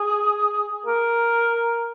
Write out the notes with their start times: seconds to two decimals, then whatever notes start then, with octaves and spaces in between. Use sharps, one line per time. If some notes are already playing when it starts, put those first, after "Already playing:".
Already playing: G#4
0.86 A#4